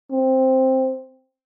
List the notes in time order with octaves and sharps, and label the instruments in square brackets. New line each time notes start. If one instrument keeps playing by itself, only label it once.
[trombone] C4